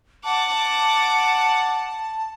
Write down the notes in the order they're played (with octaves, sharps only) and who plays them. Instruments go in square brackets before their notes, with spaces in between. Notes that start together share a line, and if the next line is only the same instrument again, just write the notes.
[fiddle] F#5 D6 [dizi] A5